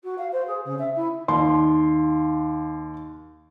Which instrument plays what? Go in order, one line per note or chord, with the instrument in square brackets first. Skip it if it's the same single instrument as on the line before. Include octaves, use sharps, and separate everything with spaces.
[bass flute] F#4
F5
C5
G#4
C#3
E5
E4
[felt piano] D#2 C6